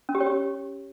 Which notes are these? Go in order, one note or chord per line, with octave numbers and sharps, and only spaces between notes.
C#4
G4
C#5
G4